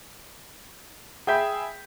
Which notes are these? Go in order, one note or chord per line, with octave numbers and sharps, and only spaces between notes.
G#4 E5 G5 B5 G6 B6